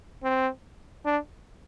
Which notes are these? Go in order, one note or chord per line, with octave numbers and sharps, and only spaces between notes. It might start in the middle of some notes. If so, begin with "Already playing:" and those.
C4
D4